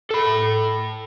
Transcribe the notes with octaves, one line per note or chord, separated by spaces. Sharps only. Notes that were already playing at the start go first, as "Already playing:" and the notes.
A4 B5